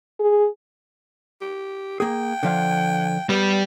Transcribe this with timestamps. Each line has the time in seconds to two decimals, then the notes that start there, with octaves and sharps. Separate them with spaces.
0.19 G#4
1.41 G4
2.00 A#3 G#4 G5
2.43 D3 F3 F5
3.29 G3 B3